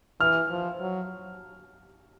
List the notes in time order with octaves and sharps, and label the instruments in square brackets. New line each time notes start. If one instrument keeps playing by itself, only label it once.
[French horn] E3 [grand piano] F6
[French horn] F3
F#3